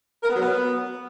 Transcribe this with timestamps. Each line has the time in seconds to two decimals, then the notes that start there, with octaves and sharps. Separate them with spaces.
0.23 A#4
0.29 B3
0.36 F#3
0.42 B3